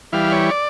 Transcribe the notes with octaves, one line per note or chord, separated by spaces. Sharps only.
E3 G3 F5
C#5
D5